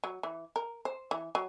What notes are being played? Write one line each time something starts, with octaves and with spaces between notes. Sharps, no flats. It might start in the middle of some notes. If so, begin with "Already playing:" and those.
F#3
E3
A#4
C5
E3
F#3